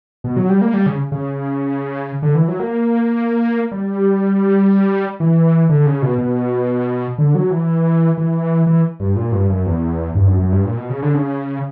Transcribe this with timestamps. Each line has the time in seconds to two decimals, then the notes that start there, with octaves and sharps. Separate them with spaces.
0.24 B2
0.37 F#3
0.50 G3
0.61 A#3
0.74 G3
0.86 C#3
1.12 C#3
2.23 D3
2.35 E3
2.48 F#3
2.60 A#3
3.71 G3
5.20 E3
5.69 D3
5.86 C#3
6.02 B2
6.18 B2
7.18 D3
7.35 F#3
7.50 E3
8.18 E3
8.67 E3
9.00 G2
9.16 A#2
9.32 G2
9.50 F#2
9.66 E2
10.15 G2
10.27 F#2
10.39 F#2
10.52 G2
10.65 A#2
10.77 B2
10.90 C#3
11.02 D3
11.14 C#3